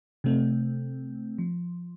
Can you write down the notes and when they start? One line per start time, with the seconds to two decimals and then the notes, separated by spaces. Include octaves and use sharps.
0.24 C3 A3 C4
1.38 F3